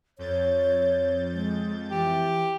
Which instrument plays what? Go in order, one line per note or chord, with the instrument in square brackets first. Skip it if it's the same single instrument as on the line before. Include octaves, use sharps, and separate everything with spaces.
[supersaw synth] F2 G6 A6 [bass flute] C#5
[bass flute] G#3
[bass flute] E3 [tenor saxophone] G4